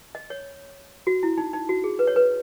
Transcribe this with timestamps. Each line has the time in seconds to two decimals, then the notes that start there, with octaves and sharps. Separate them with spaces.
0.15 D#5
0.30 C#5
1.07 F#4
1.23 E4
1.38 D#4
1.53 D#4
1.69 F#4
1.84 G#4
1.99 B4
2.07 C#5
2.16 B4